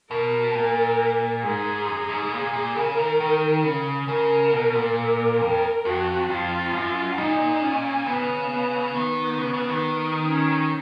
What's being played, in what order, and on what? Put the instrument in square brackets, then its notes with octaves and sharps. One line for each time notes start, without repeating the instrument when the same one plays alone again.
[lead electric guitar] B2 [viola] A#4
[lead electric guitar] A#2
[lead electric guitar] G#2 [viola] G#4
[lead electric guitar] F#2
G#2
[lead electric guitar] A#2 [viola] G#4
[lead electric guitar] A#2
[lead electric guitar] C#3 [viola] A#4
[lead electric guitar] D#3
D#3
C#3
[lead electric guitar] C#3 [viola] A#4
[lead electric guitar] B2
A#2
[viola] A#4
[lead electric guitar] F2
[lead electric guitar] F2 [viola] F#4
[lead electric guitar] F2 [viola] F4
[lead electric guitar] F#2
[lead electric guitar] A#2 [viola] D#4
[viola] C#4
[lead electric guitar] C#3 [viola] B3
[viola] B3
[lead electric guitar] D#3 [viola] B3
[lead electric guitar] C#3
C#3
D#3
[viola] C#4